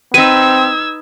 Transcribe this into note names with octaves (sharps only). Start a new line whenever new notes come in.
C4 D#4 B4 E6 G#6 D#7